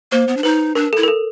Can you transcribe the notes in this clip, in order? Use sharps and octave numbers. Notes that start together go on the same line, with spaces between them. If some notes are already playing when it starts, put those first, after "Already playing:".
A#3 C5
B3
D4
D#4 B4
D4 A#4
E4 A4
A#4
A4